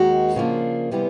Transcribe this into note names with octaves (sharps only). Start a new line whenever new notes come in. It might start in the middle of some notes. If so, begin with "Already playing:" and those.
Already playing: D#2 D#3 G#3 F#4
C#3 F3 A#3 D4
C3 E3 G3 B3